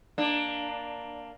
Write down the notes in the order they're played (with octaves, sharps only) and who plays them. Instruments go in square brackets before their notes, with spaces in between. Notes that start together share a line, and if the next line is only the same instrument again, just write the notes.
[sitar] A#3 D4